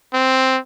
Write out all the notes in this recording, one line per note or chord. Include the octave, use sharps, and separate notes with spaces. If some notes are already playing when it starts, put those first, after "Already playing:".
C4